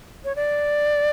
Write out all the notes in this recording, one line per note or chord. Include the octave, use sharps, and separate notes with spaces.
C#5
D5